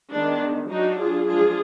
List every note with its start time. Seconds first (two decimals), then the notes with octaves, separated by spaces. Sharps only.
0.11 D#3 G#3 B3 D4
0.69 F#3 D4 D#4 F#4
0.99 F4 G#4
1.27 F3 G#3 D4 F4 G#4